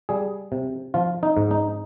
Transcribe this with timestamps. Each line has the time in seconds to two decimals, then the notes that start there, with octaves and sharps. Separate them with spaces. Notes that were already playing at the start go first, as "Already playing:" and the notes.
0.09 G3 G#4
0.52 C3
0.94 F3 F4
1.23 D#4
1.37 G#2
1.51 D#4